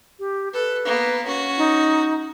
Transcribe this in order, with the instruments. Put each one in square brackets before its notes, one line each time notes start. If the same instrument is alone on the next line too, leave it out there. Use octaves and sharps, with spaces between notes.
[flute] G4
[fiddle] A4 [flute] B4
[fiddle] A#3 B3
C#4 F#4
[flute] D#4